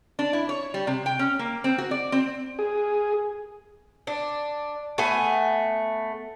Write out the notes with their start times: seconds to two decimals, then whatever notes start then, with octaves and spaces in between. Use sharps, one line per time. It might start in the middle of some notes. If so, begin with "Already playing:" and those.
0.19 D4
0.33 E4
0.49 C#5
0.74 G3
0.87 C3
1.06 G5
1.19 C#4
1.39 A#3
1.64 C4
1.78 F#4
1.91 D5
2.12 C4
2.59 G#4
4.07 D4
4.98 A3 B3 G#5